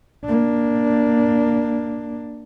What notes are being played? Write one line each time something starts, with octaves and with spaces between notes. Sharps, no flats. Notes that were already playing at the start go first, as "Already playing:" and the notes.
A#3 D4